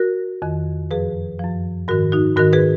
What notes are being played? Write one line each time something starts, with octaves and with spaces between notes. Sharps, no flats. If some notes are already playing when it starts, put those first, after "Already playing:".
Already playing: F#4 A#4
F2 D#3
F#2 F3 G#4 B4
F#2 F3
G#2 D#3 F#4 A#4
D#4 F#4
G#2 D#3 F#4 A#4
G#4 B4